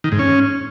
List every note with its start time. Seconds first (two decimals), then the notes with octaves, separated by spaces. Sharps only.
0.04 D#3
0.12 G#2
0.19 C#4